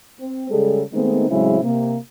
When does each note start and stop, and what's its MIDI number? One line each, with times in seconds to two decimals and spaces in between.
0.20 0.49 60
0.50 0.82 49
0.50 0.82 55
0.50 0.82 56
0.50 0.82 68
0.50 0.82 69
0.93 1.27 51
0.93 1.27 56
0.93 1.27 57
0.93 1.27 59
0.93 1.27 60
0.93 1.27 63
1.29 1.58 45
1.29 1.58 49
1.29 1.58 54
1.29 1.58 56
1.29 1.58 60
1.29 1.58 64
1.63 1.96 48
1.63 1.96 58